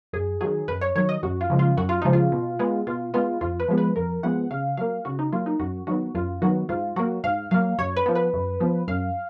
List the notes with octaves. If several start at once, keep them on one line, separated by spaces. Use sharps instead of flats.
F#2 G#4
D#3 F#3 G#4
F#2 B4
C#5
D#3 F#3 C#5
D#5
F#2 F#4
F4
C#3 F3 G#3
F4
F#2 F#4
F4
C#3 F3 G#3 D#4
F4
B2
G#3 B3
B2 F4
G#3 B3 F4
F2 F4
B4
F3 G#3 B3
B4
F2 A#4
F3 G#3 B3 F#5
C#3 F5
F#3 A#3 F5
C#3 F#4
D#4
F#3 A#3 F4
D#4
F#2 F#4
D#3 F#3 B3 F#4
F#2 F4
D#3 F#3 B3 F#4
G#2 F4
F#3 A#3 F#4
G#2 F5
F#3 A#3 F5
F#2 C#5
B4
F3 B3
B4
F#2
F3 B3
F#2 F5